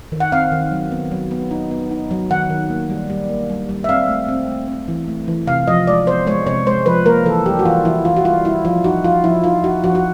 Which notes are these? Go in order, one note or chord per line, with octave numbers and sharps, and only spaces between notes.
D#3
F#5
C4 F5
D#3
F#3
B3
F#3
B3
D#4
B3
D#4
F#3
D#3 F#5
D#3
A#3
G3
G3
A#3
G3
G3
E5
C4 F5
A3
C4
A3
C4
E3
A3
E3
C3 F5
F3 D#5
G#3 D5
B3 C5
G#3 C#5
C3 C#5
G#3 C5
F3 B4
A#3 A#4
E3 A4
G3 G4
F#4
E3 F4
E3 E4
E3 F4
F#4
G3 F4
G3 E4
F3 F4
D#4 F#4
F3 F4
F3 E4
D#4 F4
D#4 F#4
F3 F#4
F#4